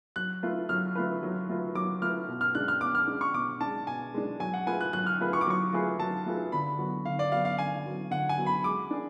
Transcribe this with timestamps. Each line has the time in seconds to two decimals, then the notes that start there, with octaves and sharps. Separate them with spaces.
0.16 F#3 F#6
0.43 A3 F4 B4
0.69 F#3 F6
0.95 A3 F4 B4
1.23 F#3
1.49 A3 F4 B4
1.75 F#3 D6
2.02 A3 F4 B4 F6
2.28 B2
2.41 F6
2.55 G#3 D4 F#6
2.68 F6
2.81 B2 D6
2.95 F6
3.07 G#3 D4
3.21 C#6
3.34 B2 D6
3.61 G#3 D4 A5
3.87 B2 G#5
4.14 G#3 D4
4.40 F#3 G#5
4.54 F#5
4.67 A3 F4 G#4 B4 G#5
4.81 F#6
4.93 F#3 F#6
5.06 F6
5.20 A3 F4 G#4 B4
5.33 C#6
5.41 D6
5.46 F#3 C#6
5.73 A3 F4 G#4 B4
5.99 F#3 A5
6.26 A3 F4 G#4 B4
6.52 D3 B5
6.79 F#3 B3 F#4
7.05 D3 F5
7.19 D5
7.31 F#3 B3 F#4 F5
7.45 F5
7.59 D3 G#5
7.85 F#3 B3 F#4
8.11 D3 F#5
8.29 G#5
8.38 F#3 B3 F#4
8.46 B5
8.64 G#3 D6
8.91 D4 G#4